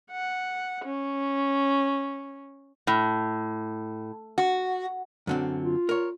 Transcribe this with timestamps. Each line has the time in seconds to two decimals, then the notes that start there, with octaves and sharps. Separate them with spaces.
0.11 F#5
0.84 C#4
2.87 A2
4.38 F#4
5.27 F#2 D3 C4
5.62 F4
5.89 A#4 C#5